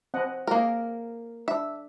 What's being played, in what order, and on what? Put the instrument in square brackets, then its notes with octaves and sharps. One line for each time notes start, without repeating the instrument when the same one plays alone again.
[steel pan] C4 D#5 F#5
[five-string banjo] A#3 A#4 [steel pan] G#4 D#5
[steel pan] D4 [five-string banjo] E5